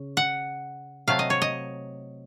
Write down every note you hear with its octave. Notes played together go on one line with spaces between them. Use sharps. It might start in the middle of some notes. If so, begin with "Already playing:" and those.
Already playing: C#3
F#5
C3 F#3 A3 F5
D#5
C#5
D#5